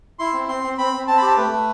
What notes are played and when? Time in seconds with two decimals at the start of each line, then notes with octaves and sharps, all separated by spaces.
0.19 E4 C6
0.33 C4
0.49 C4 C6
0.64 C4
0.78 C4 B5
0.93 C4
1.07 C4 A5
1.17 B5
1.22 G4 A5
1.37 A3 B4
1.52 A3